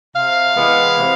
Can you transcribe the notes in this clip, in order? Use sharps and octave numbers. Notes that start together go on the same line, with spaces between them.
C3 F5
E3 G#3 B3
C3